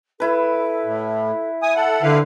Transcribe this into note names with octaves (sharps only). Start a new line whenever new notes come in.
E4 A4 B4
A2
E5 G#5 D#6
A4 F#5
D3 E4 B4 F5